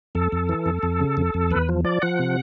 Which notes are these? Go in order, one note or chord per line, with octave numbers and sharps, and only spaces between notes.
F2 A4
F2
E3
F2
F2
C#3
F2
F2
E2 B4
F3
F3 D5
F3 F#5
C3